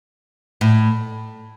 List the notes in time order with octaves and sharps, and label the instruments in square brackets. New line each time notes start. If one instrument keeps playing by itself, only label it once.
[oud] A2